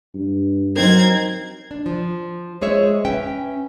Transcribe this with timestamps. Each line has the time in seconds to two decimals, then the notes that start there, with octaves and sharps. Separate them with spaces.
0.14 G2
0.76 F#3 C4 D#4 A#4 G#6
1.71 D4
1.86 F3
2.61 G#3 G#4 C5 C#5 E5
3.05 C#4 B4 E5 G5